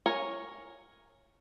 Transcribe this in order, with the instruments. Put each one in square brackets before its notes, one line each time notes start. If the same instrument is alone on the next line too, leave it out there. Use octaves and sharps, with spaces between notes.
[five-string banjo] A#4 C#5 G#5